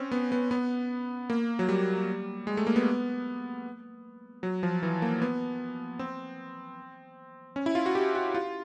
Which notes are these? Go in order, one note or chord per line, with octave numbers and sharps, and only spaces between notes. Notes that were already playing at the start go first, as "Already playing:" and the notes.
Already playing: C4 C#4
B3
B3
B3
A#3
F#3
G3
G#3
A3
A#3
B3
F#3
F3
E3
A#3
B3
C4
C#4
E4
F4
F#4
G4
F#4
F4